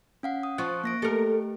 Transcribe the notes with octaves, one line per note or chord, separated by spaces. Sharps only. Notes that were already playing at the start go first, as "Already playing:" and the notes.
C#4 F5 F#5
D#6
F3 F4 C#6 F#6
A#3 A#6 D7
A3 G4 A4 A#4